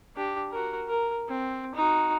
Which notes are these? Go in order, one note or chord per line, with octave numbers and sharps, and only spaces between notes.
D4 G4
F#4 A#4
A#4
C4
D#4 F#4